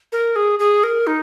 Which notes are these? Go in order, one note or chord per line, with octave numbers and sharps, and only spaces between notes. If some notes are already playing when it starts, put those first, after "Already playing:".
A#4
G#4
G#4
A#4
D#4